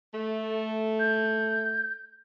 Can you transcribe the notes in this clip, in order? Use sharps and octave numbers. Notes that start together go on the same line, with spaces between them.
A3
G6